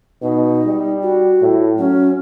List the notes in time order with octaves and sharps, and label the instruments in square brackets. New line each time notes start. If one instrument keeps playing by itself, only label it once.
[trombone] B2 [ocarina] D#4
[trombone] G3
[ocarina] F#4
[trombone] A2
[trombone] F#3 [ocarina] C#4